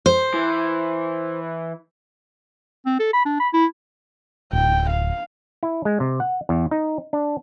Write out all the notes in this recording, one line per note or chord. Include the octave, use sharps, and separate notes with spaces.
C5
E3
C4
A4
B5
D4
B5
E4
D1 G5
F5
E4
G#3
C3
F#5
E2
D#4
D4